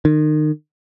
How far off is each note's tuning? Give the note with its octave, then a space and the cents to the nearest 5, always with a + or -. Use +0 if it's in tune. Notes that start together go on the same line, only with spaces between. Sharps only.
D#3 -30